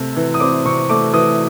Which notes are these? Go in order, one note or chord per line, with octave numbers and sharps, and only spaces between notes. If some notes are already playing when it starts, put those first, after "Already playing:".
Already playing: C3 A3
E3
D#6
C4 D6
C3 C#6
A3 D6
E3 D#6